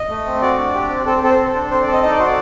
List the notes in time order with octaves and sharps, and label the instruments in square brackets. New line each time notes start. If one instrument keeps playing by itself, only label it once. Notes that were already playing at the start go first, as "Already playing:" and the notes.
Already playing: [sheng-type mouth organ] D#5
A3
C4
F#4 D5
D4
G4
C4
C4 A4
C4 A4
C5
A4
D4
C4 C5
D5
A4
D#5
D#4 D#5
D5
F#4 C5
D5